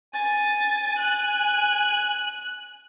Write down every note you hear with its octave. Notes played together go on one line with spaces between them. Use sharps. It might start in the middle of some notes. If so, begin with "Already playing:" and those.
G#5 A6
F#6